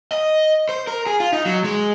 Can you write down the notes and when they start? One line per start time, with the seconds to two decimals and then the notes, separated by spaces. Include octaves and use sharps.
0.12 D#5
0.69 C5
0.87 A#4
1.06 G#4
1.20 F4
1.33 D#4
1.45 F#3
1.64 G#3